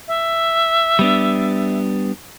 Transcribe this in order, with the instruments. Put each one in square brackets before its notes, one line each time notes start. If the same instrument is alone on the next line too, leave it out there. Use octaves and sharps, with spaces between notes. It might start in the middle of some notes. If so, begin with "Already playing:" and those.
[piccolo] E5
[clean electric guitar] G3 B3 D4